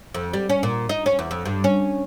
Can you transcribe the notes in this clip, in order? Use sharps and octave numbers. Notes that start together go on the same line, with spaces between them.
F2
G3
C#4
A#2
D#4
C#4
E2
F2
G2
C#4